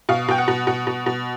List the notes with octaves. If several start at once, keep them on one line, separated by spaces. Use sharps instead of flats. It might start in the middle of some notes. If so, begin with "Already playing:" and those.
B2 F5
B2 G5
F#5
B2
B2 F#5
B2
B2